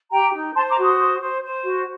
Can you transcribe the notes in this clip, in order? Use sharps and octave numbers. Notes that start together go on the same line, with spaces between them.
G4 G5 A#5
D#4
C5 A5 C6
A#5 D6
F#4
C6 D#6
C5
C5
C5
F#4